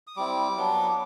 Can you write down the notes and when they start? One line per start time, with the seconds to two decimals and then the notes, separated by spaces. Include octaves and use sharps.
0.07 D#6
0.16 G3 C4 E4 D6
0.56 F#3 B3 D4